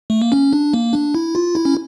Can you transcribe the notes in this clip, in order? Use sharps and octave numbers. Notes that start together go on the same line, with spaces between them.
A3
A#3
C#4
D4
A#3
D4
E4
F4
E4
C#4